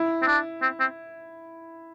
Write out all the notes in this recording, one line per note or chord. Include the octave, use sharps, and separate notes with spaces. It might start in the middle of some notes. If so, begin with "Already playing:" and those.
Already playing: E4
C4
D4
C4
C4